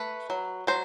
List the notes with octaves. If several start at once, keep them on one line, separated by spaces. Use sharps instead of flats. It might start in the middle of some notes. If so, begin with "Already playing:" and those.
Already playing: A3 B4
F#3
F#3 C5